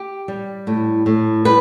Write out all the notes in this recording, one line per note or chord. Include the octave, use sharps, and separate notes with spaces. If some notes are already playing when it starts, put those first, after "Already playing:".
Already playing: G4
G3
A2
A2
G3 B4